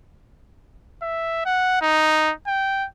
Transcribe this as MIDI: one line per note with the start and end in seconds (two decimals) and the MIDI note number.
1.03 1.45 76
1.46 1.80 78
1.82 2.33 63
2.47 2.87 79